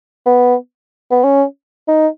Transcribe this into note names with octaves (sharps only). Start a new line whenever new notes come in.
B3
B3
C#4
D#4